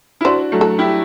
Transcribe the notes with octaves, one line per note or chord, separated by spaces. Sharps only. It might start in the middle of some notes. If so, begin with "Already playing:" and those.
E4
D4 F#4 C5
F#3 A3
A4
E4 G4